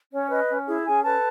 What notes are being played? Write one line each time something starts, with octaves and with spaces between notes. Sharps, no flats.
C#4 C#5
B4 D#5
C#4
E4 G#4 E5
C#4 G#4 G#5
A4 B4 A5